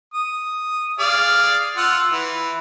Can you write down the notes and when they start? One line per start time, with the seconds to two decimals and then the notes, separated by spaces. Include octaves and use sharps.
0.14 D#6
1.00 G#4 D5 F5
1.77 F4 F#5 E6
2.11 E3